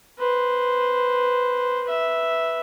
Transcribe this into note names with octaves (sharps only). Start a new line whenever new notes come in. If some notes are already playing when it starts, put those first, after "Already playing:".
B4 C5
B4 E5